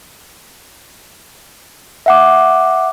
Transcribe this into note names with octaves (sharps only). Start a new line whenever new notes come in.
E5 F#5 D6